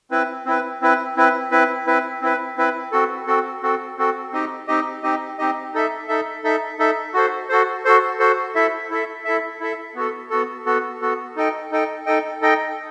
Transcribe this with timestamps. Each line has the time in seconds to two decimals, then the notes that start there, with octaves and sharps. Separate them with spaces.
0.11 C4 E4 B4
0.46 C4 E4 B4
0.81 C4 E4 B4
1.16 C4 E4 B4
1.51 C4 E4 B4
1.87 C4 E4 B4
2.21 C4 E4 B4
2.57 C4 E4 B4
2.92 C4 F#4 A4
3.27 C4 F#4 A4
3.62 C4 F#4 A4
3.98 C4 F#4 A4
4.32 C4 D#4 G4 D#5
4.68 C4 D#4 G4 D#5
5.03 C4 D#4 G4 D#5
5.38 C4 D#4 G4 D#5
5.74 D#4 A4 E5
6.08 D#4 A4 E5
6.44 D#4 A4 E5
6.79 D#4 A4 E5
7.14 F#4 A4 C5
7.49 F#4 A4 C5
7.85 F#4 A4 C5
8.19 F#4 A4 C5
8.55 E4 A4 E5
8.90 E4 A4 E5
9.25 E4 A4 E5
9.60 E4 A4 E5
9.95 B3 F#4 A4
10.30 B3 F#4 A4
10.66 B3 F#4 A4
11.01 B3 F#4 A4
11.36 D#4 A4 D#5 G5
11.71 D#4 A4 D#5 G5
12.06 D#4 A4 D#5 G5
12.42 D#4 A4 D#5 G5